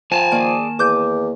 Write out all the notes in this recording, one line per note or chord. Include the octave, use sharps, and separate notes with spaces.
F3 G#5 A5
D#3 A#3 G#4 D5
E2 D6 G6